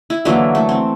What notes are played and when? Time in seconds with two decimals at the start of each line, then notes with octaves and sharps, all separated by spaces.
0.10 E4
0.25 D3 E3 F#3 A#3
0.55 A3
0.69 C4